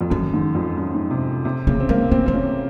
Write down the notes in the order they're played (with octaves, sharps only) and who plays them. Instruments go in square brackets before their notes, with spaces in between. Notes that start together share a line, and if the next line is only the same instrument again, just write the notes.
[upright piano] F2
[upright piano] F#2 [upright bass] D#3
[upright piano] G#2
F2
F#2
G#2
C3
C3
[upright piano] C#3 [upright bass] A#3
[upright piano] C4
[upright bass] G#3 [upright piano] A#3
[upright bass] A#3 [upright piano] C4
[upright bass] D#3 [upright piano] C4
[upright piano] C#4